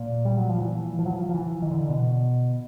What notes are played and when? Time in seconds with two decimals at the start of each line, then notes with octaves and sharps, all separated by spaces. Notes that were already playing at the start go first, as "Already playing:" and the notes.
Already playing: A#2
0.25 G3
0.38 F#3
0.49 F3
0.61 E3
0.99 F3
1.06 F#3
1.12 F3
1.29 F3
1.34 E3
1.62 D#3
1.71 D3
1.89 B2